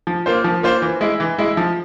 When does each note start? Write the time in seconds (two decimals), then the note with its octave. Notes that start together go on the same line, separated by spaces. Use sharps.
0.07 F3
0.26 A#3 F4 C5
0.44 F3
0.63 A#3 F4 C5
0.82 E3
1.01 G#3 E4
1.20 E3
1.38 G#3 E4
1.57 F3